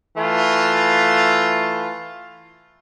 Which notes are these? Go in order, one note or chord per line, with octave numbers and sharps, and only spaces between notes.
E3 A3 F4